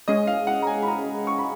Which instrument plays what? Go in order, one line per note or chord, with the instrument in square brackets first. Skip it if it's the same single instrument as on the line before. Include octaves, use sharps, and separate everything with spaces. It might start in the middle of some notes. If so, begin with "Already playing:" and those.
[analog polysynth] G#3 C#4 G#4 [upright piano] D#5
[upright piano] F5
F#5
A#5
G#5
B5
A#5
C#6
B5